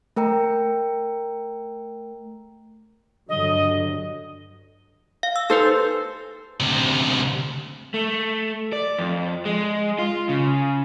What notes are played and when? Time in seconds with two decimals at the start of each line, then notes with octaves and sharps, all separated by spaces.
0.16 A3 A#4 G5 A#5
3.29 G2 D3 F#3 D#5
5.23 F5
5.36 E6
5.50 D#4 A4 B4 C5
6.60 D2 C3
7.94 A3
8.73 D5
8.98 F2
9.45 G#3
9.99 F4
10.29 C#3